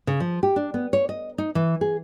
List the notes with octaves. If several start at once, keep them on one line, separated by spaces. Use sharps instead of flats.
C#3
F3
G4
D4
B3
C#5
D#5
D#4
E3
G#4